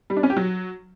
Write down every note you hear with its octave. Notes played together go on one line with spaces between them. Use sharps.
G3
D4
C#4
G4
F#3